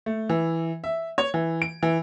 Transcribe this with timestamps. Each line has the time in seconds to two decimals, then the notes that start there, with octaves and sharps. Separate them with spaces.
0.06 A3
0.29 E3
0.84 E5
1.18 C#5
1.34 E3
1.62 D7
1.83 E3